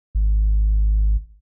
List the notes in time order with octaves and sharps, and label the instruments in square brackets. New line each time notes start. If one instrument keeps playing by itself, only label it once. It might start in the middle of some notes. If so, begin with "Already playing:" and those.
[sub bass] G#1